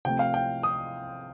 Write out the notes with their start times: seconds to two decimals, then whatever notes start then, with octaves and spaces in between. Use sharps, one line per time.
0.05 C3 F3 A3 G5
0.19 F5
0.34 G5
0.63 D#6